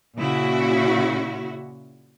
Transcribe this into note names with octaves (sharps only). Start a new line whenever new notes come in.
A#2 C#3 E4 F#4